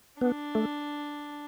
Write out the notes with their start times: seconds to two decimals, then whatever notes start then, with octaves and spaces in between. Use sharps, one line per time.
0.21 B3 D4
0.55 A3